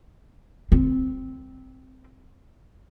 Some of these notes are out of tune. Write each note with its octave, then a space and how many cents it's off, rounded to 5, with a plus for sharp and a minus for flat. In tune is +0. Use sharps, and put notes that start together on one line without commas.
C4 -5